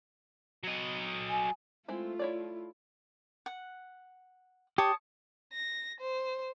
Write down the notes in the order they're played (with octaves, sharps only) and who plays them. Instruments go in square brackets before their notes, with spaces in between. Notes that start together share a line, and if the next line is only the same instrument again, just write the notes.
[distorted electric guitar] F#3 D#5
[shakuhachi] G#5
[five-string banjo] G#3 C4 E4 [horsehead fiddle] A3 F4
[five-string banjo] E4 C#5 D5
[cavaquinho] F#5
[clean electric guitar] G4 [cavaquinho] C#5 A5 D#6
[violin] A#6
C5